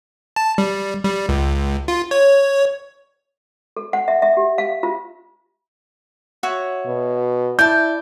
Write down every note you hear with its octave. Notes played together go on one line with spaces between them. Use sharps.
A5
G3
G3
C#2
F4
C#5
A4
F#5
E5
E5
G4
F5
F4
F#4 C#5 E5
B2
E4 D5 A5 G6